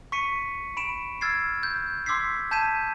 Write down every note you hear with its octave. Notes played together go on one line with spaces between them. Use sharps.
C#6 B6 C#7 D#7
B5 D7 E7
E6 F6 G#6 A6 C7
G6
C6 D6 E6 G#6 B6 C7
A5 G6 G#6 B6 D#7 E7